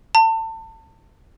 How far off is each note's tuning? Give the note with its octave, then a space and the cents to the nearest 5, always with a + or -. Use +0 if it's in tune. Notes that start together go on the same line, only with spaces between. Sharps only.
A5 +30